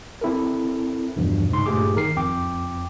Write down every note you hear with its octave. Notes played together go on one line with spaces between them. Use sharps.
C4 E4 A4 A#4
E2 G2 B2 E3 F3
C2 G#2 C#3 C6
G2 A#2 A3 G4 G#4 D6
G#1 D#3 A#4 C7
F2 G5 D6